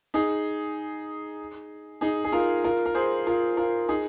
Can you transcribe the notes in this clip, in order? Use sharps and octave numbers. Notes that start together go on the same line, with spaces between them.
D#4 G#4
D#4 G#4
G#4
F4 A#4
F4 A#4
A#4
G#4 C5
F4 A#4
F4 A#4
D#4 G#4